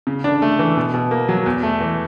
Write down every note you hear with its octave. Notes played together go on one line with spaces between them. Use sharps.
C#3
D4
A3
E3
B2
B2
A#3
F#3
E2
A3
E3